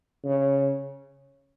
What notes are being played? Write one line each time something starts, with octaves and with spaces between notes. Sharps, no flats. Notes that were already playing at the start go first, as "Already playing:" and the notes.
C#3